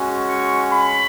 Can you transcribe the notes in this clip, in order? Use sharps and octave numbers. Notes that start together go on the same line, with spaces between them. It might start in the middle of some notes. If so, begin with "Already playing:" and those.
Already playing: G#3 C#4 F#4
C#6
B5